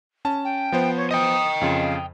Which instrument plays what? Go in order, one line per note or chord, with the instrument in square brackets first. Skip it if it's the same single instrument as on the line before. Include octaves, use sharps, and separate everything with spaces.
[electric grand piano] C#4 A5
[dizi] G5
[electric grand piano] F3 B3 C5
[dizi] C#5
[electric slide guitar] D#5 G5 [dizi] D#6
[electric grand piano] F2 C#3 F4 [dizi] F5